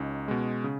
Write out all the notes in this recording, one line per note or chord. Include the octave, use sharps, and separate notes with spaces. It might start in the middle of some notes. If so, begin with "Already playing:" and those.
Already playing: C#2 C#4 D#4
B2 G#3
C#3